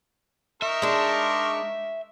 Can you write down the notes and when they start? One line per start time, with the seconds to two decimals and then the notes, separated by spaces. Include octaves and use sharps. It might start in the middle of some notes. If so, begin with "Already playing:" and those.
0.62 D#4 A#4 E5 C#6
0.82 G#3 D4